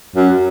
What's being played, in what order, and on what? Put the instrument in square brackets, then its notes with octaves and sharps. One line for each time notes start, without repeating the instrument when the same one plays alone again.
[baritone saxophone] F#2